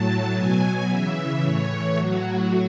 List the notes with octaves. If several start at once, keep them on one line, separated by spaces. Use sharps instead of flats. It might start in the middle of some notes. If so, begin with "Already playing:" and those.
Already playing: A2 F#3 A5
B2 F#3 G#5
C#3 E3 E5
A2 E3 C#5
A2 F#3 F#4